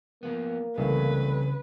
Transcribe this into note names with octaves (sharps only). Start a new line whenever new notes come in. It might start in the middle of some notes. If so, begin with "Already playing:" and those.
F3 A#3 B3
C2 C#3 E3 A3 B4